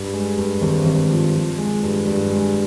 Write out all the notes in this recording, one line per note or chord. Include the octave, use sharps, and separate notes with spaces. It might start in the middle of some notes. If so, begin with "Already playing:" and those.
Already playing: G2
G#3
G2
G#1
G#1
F3
F3
G#3
G2
G2
G#3